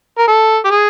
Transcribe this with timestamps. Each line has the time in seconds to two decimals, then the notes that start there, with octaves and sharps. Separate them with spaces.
0.18 A#4
0.28 A4
0.65 G4
0.70 G#4